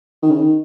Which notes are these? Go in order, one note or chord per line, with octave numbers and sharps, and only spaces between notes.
D#3
C#3
D#3